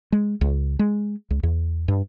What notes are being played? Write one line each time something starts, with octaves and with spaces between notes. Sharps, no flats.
G#3
C#2
G#3
C#2
E2
G2